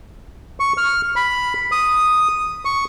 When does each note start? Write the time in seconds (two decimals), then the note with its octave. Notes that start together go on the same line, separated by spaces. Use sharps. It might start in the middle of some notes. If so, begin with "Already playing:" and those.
0.60 C#6
0.78 F6
1.16 B5
1.72 D#6
2.65 C#6